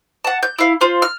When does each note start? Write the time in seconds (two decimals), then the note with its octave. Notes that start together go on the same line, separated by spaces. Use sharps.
0.24 F#5 A5
0.43 G6
0.59 E4 F5
0.81 F4 C5
1.02 F6